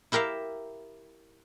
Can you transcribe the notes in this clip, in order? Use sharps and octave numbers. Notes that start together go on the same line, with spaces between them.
E4 G4 A#4 E5 F5